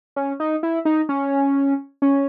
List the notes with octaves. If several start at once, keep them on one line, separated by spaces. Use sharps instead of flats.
C#4
D#4
E4
D#4
C#4
C#4